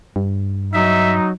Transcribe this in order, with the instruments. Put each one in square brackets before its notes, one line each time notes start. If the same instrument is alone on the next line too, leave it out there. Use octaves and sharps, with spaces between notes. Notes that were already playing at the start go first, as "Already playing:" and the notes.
[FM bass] G2
[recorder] F#3 [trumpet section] D#4 [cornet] E5